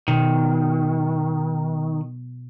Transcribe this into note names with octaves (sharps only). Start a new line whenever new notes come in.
B2 D#3